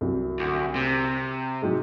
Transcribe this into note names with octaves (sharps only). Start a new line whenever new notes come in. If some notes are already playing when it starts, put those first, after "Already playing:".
C2 F#3
D2
C3
G#2 F#3